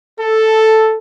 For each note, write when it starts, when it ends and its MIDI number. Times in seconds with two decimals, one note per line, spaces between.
0.20 0.98 69